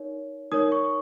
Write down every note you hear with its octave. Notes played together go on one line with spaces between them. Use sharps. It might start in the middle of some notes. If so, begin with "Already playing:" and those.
Already playing: D#4 A#4 C#5
D#4 A#4 C#5 D#6
C#6